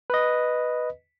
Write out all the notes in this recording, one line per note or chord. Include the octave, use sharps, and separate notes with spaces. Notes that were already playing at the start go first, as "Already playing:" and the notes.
B4 D#5